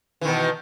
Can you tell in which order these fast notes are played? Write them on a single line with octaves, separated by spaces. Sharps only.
E3 D#3 B2